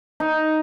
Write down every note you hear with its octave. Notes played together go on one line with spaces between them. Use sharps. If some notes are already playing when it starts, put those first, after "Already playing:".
D#4